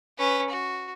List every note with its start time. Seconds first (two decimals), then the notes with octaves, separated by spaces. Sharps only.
0.18 C#4 B4
0.50 F#4